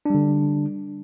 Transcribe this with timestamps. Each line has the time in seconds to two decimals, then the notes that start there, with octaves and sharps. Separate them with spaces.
0.06 D4
0.10 G3
0.15 D3